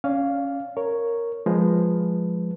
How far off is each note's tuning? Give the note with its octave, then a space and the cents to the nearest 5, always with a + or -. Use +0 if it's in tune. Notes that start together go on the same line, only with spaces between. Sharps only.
C#4 +0 D5 -25 F5 +0
A#4 -5 C#5 +0
F3 +10 G#3 +0 B4 +0